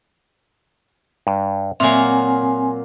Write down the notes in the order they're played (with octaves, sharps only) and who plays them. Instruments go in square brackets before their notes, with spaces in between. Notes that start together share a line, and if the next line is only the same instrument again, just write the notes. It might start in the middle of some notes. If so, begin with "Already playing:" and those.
[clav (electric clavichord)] G2
[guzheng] A#2 F#3 A#3 [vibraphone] C4 G#5 [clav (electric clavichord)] E5